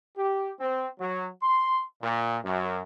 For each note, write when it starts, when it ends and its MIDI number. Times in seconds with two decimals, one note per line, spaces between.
0.16 0.51 67
0.60 0.87 60
0.99 1.29 54
1.42 1.83 84
2.01 2.38 46
2.44 2.81 42